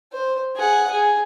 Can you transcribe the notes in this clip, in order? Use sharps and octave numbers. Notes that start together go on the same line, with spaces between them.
C5
G#4 F#5
G#4